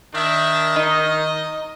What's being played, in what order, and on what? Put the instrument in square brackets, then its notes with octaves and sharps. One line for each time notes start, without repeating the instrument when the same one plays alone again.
[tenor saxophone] D#3 [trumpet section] D4 E5
[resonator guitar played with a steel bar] D#4 [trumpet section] D#5